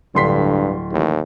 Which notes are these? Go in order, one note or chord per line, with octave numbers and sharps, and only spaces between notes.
D1 G2 D3 C6 B6
A1 D#2